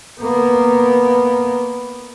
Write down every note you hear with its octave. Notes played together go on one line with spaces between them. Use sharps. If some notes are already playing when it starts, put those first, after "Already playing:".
A#3 B3